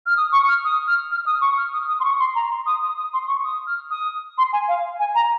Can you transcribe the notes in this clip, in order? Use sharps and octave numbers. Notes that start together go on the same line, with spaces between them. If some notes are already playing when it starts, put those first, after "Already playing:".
F6
D#6
C#6
F6
D#6
F6
F6
D#6
C#6
F6
D#6
D#6
C6
C#6
C6
A#5
C6
D#6
D#6
D#6
C6
C#6
D#6
F6
D#6
C6
G#5
F5
G#5
A#5